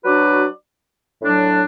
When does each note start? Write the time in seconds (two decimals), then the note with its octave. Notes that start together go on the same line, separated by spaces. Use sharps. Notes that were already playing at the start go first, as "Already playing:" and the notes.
0.04 F#3 D4 F#4 B4 D5
1.22 A2 F#3 D4